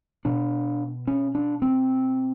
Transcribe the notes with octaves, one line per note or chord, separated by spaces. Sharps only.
B2 D4
C#4
D4
C4